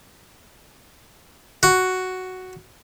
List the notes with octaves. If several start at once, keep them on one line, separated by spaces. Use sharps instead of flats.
F#4